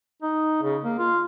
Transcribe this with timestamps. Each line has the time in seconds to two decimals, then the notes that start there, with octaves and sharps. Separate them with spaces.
0.22 D#4
0.63 C#3
0.84 A#3
0.99 F4